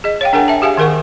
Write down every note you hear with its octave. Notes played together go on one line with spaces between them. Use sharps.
G#4 D#5
C#5 F5 G5
D4 G#4 A#4 F#5 G#5
E5 A5
G4 G#4 E5 F5 G#5
D#3 G#4 A#4 F#5 C#6